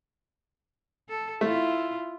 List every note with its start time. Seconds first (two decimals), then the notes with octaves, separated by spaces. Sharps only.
1.09 A4
1.41 A3 E4 F4